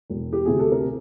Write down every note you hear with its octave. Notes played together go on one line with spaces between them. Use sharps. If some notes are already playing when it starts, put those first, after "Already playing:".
E1
G4
D2 C3 G#4
A4
A#4